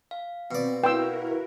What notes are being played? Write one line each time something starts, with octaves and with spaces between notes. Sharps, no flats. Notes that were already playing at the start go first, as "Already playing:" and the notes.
F5
B2 C4 D5
E4 F#4 A#4 B4 F5 G5 C6 E6